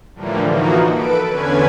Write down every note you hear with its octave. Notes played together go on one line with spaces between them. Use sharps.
A2 D3 E3 F3 G3 A#3
E3 F3 A#3 D#4 F#4
A4 B4 D7
E2 D3 C#4 B4 G#5 G#6